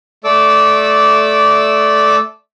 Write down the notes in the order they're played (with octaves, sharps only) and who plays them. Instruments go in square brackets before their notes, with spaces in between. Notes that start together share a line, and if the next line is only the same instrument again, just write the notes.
[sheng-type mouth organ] A3 A4 D5 D6 E6